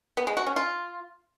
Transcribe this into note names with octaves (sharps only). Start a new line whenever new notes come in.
B3
G#3
F#4
C#4
F4